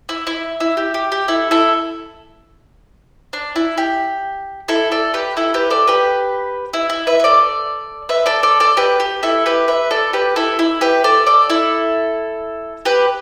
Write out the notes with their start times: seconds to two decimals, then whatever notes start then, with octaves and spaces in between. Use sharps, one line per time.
0.09 E4
0.27 E4
0.60 E4
0.77 G4
0.94 G4
1.12 G4
1.28 E4 A4
1.51 E4 A4
3.33 D4
3.56 E4
3.78 G4
4.68 E4 A4
4.92 A4 D5
5.14 G4 B4
5.37 E4 A4
5.54 G4 B4
5.70 A4 D5
5.87 G4 B4
6.73 E4
6.90 E4
7.07 B4 E5
7.20 B4
7.24 A4 D5
8.09 B4 E5
8.26 A4 D5
8.43 A4 D5
8.60 A4 D5
8.77 G4 B4
9.00 G4
9.23 E4 A4
9.46 G4 B4
9.68 B4 E5
9.91 A4 D5
10.13 G4 B4
10.36 E4 A4
10.59 E4
10.81 G4 B4
11.04 A4 D5
11.26 A4 D5
11.50 E4 A4
12.85 G4 B4